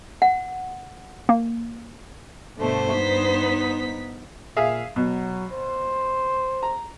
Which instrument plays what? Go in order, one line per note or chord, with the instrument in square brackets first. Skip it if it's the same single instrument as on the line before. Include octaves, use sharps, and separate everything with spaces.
[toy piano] F#5
[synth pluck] A#3
[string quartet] G2 C5 [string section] B2 D3 A3
[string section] B3 D#4 B6
[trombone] A#2 [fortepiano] G#4 E5 F5
[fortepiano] B2 [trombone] F#3
[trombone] C5
[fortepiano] A#5